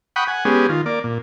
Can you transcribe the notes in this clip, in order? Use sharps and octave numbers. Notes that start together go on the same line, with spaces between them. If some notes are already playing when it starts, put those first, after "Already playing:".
F#5 G5 B5 C#6 D#6
F#5 G#5
G#3 B3 C#4 G4 G#4
D#3 F4
A#3 D5
A#2